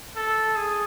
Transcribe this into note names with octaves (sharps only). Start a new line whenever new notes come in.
A4
G#4